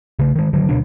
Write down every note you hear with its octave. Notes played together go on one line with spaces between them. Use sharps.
C#3 A3
D#3 G#3
G2 D3 F#3
D2 B2 A3 D4